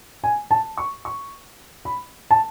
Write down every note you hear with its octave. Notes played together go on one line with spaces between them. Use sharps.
G#5
A5
C#6
C#6
B5
A5